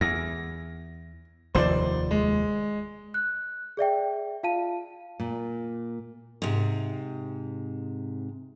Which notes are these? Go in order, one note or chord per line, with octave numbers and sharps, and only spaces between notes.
E2 A#6
F1 D#2 F3 C5 D5
G#3
F#6
G#4 D5 E5 G5
F4 F5 A5 D#7
A#2
G#2 C3